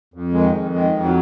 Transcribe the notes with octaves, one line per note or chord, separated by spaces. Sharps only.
F2
D#3 G#3
F2
D#3 G#3
F2
F#3